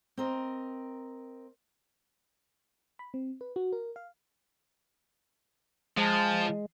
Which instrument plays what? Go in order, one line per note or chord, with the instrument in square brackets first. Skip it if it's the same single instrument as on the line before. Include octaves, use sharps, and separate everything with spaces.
[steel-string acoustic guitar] C4 A#4 D#5
[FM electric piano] B5
C4
B4
F#4
A#4
F5
[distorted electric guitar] F3 [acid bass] G#3 [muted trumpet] A5